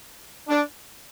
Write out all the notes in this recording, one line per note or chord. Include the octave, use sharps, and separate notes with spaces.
D4